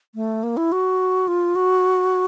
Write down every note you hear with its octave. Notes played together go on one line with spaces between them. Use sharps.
A3
A#3
E4
F#4
F4
F#4